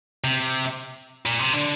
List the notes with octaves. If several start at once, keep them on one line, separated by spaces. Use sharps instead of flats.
C3
A#2
C3
D3